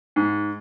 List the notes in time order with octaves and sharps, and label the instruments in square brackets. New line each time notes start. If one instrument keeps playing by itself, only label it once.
[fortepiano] G#2